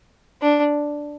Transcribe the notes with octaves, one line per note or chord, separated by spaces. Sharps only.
D4